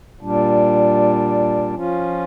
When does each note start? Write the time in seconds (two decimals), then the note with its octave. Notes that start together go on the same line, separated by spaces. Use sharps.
0.21 A#2 G3 D4
1.74 F3 C#4 F4